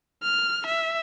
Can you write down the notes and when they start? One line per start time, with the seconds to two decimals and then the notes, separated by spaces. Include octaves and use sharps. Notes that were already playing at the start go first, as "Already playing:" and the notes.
0.23 F6
0.67 E5